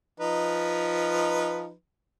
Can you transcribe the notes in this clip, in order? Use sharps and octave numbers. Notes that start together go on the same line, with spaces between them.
F3 D#4 B4